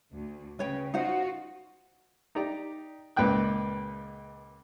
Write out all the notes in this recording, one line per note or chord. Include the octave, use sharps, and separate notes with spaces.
D2
C#3 B4 C#5 G5
D#4 F4 F#4 C5 F#5
D#4 G4 D5 A#5
C#2 A#2 B4 G5 F#6